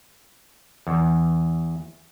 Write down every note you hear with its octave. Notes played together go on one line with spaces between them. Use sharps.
E2